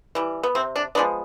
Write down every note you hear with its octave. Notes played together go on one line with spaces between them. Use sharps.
E3 G3
B3
C3 C4
D4
F3 G#3 B3 D4